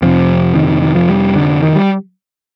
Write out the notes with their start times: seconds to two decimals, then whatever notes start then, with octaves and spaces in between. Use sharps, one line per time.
0.02 F2 C3 F3
0.55 D#3
0.68 D#3
0.82 D#3
0.95 F3
1.09 G3
1.36 D3
1.62 D#3
1.75 G3